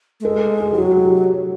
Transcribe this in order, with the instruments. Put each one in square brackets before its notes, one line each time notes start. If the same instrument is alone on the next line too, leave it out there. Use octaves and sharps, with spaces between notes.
[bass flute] A3
[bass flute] G#3 [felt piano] A4
[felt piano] G#4
[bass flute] F3 [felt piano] G4
[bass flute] F#3 [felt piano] F#4
[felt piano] G4